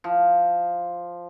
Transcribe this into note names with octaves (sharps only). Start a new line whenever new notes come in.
F3